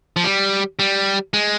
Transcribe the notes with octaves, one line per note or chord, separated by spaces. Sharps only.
F3
G3
G3
G#3